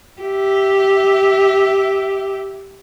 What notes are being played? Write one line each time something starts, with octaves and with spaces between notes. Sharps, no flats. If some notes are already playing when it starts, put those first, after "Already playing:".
G4 E5